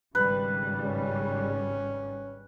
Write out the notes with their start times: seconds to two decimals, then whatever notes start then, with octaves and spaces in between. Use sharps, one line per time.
0.15 G#1 C#3 G3 B4
0.86 C#4